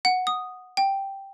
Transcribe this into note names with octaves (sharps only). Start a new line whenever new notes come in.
F#5
D#6
G5